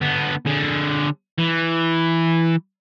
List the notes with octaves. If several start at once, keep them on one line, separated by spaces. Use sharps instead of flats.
D3 B3
D3 G#4
E3